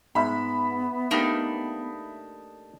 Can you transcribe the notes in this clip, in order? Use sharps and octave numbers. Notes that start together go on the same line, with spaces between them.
G#2 B3 E5 B5
A3 A#3 D4 D#4 G4